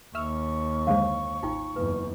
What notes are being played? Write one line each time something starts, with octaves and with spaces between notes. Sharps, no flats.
D#2 E5 C#6 E6 F6
F#2 D3 G#3 C5 F5
A1 D#4 F4 G5
F#1 E2 B4